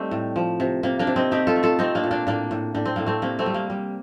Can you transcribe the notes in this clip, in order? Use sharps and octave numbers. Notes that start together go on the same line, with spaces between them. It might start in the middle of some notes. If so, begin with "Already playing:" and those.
Already playing: G3 A3 C4 D#4
A2
F3
C3
C3 A#3
A#3 D4
C3
C4 D#4
A3 D#4 G4
F4 A4
A3
F4 A4
A3 C4 D#4
A#3 D4
A#2
A#3 D4
A2 A#3 D4
A2
A2 D4
C4
A2 A#3
A3 C4
C3 A#3
A3 C4
G3
A#3
G3